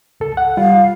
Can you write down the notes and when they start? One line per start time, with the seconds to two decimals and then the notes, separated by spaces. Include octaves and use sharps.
0.20 C#2 A4
0.37 F#5
0.57 G3 F4 F5